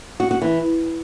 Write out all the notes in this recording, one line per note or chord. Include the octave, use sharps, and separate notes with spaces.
F#4
F#4
E3